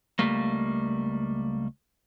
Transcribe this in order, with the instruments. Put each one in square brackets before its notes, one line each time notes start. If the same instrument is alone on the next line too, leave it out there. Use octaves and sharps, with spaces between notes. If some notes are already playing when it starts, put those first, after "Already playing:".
[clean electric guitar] C#2 G3 A3 A#3